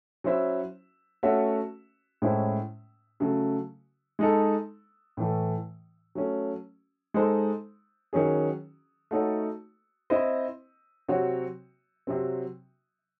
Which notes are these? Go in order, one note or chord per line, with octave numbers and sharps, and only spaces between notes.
F#3 C#4 E4 C5 E5
A3 C#4 F#4 C#5 E5
A2 G#3 C#4 E4 C5
C#3 F#3 A3
G#3 D#4 A4
A2 E3 A3
F#3 A3 C#4
G#3 D#4 A4 C5
D#3 F#3 C#4 G#4
A3 D#4 F#4 A4 C#5
C4 E4 C5 D#5
C3 F#3 C4 F#4 C#5
C3 F#3 C4